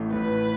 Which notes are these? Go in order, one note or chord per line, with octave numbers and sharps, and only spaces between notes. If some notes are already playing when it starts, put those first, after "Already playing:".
Already playing: A1 A2 A3
A1 A2 A3 B4